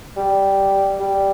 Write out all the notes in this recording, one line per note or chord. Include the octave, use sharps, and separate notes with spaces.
G3
G3